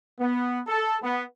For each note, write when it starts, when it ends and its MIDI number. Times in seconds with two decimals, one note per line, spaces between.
0.19 0.60 59
0.67 0.97 69
1.03 1.23 59